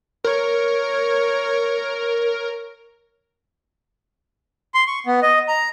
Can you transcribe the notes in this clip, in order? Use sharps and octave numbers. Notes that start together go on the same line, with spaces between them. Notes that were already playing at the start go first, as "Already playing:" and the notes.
A#4 C#5
C6
C#6
B3
D#5
A#5